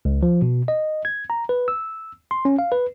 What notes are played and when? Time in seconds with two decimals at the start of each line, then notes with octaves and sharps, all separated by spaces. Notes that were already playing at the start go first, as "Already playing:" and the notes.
0.05 C#2
0.23 F3
0.42 B2
0.68 D#5
1.05 G#6
1.30 A#5
1.49 B4
1.68 E6
2.31 C6
2.45 C#4
2.59 F5
2.72 B4